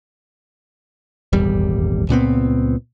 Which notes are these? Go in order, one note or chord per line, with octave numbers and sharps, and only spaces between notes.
D#1 G#1 E2 G3
C#2 A#2 B3 C4